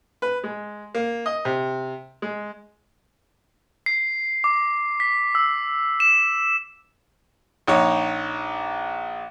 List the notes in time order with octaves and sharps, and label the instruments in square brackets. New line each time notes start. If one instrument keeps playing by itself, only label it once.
[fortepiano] B4
G#3
A#3
D#5
C3
G#3
[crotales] C7
D6
B6
E6
E7
[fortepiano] A#1 D#4 C#5